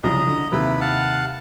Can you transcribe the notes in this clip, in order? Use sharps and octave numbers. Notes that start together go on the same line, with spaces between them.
C2 C#3 F3 D#5 A#5
D3
D#2 C3 E4 B4
F5 F#5 A5